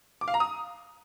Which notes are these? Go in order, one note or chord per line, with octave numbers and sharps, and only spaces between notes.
D6
F5
A#5
D#6